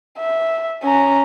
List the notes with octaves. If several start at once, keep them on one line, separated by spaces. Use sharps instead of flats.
E5
C#4 A#5